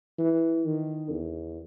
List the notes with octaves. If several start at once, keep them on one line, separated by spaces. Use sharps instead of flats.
E3
D#3
E2